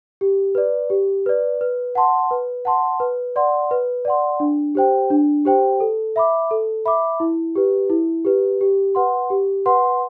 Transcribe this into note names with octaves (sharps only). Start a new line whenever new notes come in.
G4
B4 D5
G4
B4 D5
B4
F#5 A5 C6
B4
F#5 A5 C6
B4
D5 F#5 C6
B4
D5 F#5 C6
D4
G4 C5 G5
D4
G4 C5 G5
A4
E5 B5 D6
A4
E5 B5 D6
E4
G4 B4
E4
G4 B4
G4
B4 F#5 C6
G4
B4 F#5 C6